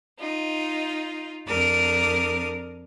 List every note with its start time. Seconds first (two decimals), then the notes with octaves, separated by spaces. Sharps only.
0.18 D#4 F4
1.48 F2 D4 A#4 D6 D#6 F6